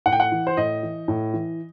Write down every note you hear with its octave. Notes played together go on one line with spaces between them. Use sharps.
A2 F#5
G5
F#5
E3
C5
A2 D#5
E3
A2
E3